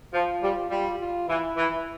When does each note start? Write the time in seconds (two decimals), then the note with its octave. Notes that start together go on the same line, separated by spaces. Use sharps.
0.13 F3 F4
0.42 G3
0.70 G3 F4
0.99 F4
1.28 E3 E4
1.57 E3